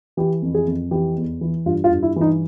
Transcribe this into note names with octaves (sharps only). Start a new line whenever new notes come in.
E3 G4
F2
G#4
F2
E3 G4
E2
E3
G2 F4
F4
G2
E4
E3
D#4